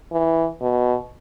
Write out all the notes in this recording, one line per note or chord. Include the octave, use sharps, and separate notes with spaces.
E3
B2